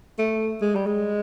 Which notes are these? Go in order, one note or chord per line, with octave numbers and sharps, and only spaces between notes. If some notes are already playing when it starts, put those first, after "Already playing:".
A3
G#3
G3
G#3